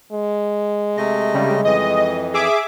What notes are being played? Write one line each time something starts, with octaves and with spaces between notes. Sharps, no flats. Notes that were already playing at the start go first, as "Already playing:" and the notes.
G#3
C3 A3 D#5
C#3 G3
F2 E3 D#5
G#4 E5 D6